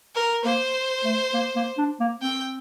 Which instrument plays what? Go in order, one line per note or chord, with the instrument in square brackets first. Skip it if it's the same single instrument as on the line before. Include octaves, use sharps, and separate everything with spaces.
[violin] A#4
[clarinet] A#3 [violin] C5
[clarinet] A3
A#3
A#3
D4
A#3
[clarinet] C4 [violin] G5